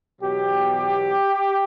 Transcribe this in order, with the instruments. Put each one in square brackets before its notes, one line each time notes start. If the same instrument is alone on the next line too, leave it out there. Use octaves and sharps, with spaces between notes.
[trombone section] E2 B2 F#3 G4